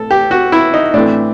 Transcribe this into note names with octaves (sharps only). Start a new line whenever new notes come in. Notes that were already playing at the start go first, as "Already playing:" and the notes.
Already playing: A2 A4
G4
F#4
E4
D#4
A2 E3 A3 C4 D4